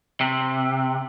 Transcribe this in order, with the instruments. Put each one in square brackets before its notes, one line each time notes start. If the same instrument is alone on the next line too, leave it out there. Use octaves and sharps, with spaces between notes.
[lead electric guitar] C3